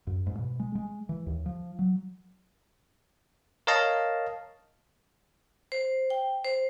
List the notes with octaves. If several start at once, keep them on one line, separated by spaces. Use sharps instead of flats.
F#2
G#2
B2
G#3
G#3
E3
D#2
F3
F#3
A#4 C#5 D#5 F5 A5 A#5
C5
G5
C5